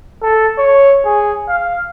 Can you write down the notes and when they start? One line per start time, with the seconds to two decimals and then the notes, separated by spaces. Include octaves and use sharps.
0.22 A4
0.58 C#5
1.06 G#4
1.48 F5